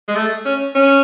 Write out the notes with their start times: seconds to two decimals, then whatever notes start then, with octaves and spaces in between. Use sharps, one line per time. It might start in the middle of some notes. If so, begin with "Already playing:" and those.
0.08 G#3
0.15 A3
0.45 C#4
0.75 C#4